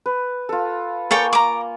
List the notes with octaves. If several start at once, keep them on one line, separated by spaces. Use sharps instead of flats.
B4
F4 A4
A#3 A4 C#5 G5 G#5 C#6
A#5 D6